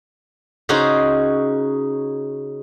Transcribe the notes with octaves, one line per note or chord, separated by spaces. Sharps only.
C#3 D#4 F#4 G#4 C5